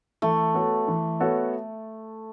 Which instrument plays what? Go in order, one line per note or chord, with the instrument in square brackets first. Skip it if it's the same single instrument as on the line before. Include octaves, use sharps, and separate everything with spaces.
[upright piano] E3 [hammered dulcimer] A3
[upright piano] B3 F#4 A4 C#5
E3
B3 F#4 A4 C#5